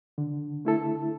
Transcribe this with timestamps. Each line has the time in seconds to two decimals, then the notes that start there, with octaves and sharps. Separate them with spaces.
0.18 D3
0.65 A3 E4 A4